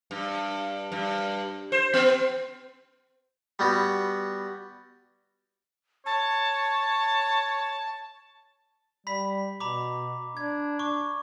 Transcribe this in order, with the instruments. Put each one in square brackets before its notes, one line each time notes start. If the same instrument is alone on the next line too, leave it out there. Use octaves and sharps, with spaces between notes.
[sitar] G2
G2
C5
B3
[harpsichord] G3 B3 F#4
[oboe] C#5 [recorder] A5
[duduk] G3 [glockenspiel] B5 B6
[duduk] B2 [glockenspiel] A#5 B5 D6
[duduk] D4 [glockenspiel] G#6
[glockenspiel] C#6 D6